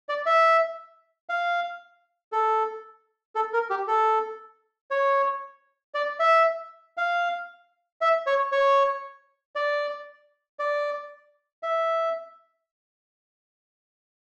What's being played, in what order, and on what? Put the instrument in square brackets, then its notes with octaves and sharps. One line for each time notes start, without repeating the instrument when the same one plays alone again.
[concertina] D5
E5
F5
A4
A4
A#4
G4
A4
C#5
D5
E5
F5
E5
C#5
C#5
D5
D5
E5